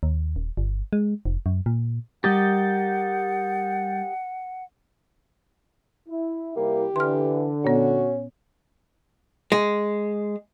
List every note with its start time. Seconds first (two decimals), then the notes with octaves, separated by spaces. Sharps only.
0.03 D#2
0.36 D#1
0.57 G1
0.93 G#3
1.25 F1
1.46 F#2
1.66 A#2
2.24 G3 G4 A#4 D#5 F#5 G6 A6
6.08 E4
6.56 C3 G3 A#3 E4 G4
6.96 D3 E3 C6 F6
7.64 A#2 B3 C#4 F#4
9.52 G#3